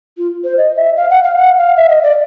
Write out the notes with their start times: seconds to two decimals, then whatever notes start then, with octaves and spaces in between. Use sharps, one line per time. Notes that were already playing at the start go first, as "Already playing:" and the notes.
0.18 F4
0.44 C5
0.58 D#5
0.76 E5
0.97 F5
1.10 F#5
1.24 F5
1.36 F#5
1.57 F5
1.77 E5
1.90 D#5
2.03 D5